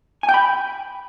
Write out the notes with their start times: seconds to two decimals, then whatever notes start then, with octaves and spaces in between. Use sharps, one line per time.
0.23 G#5
0.29 G5
0.34 B5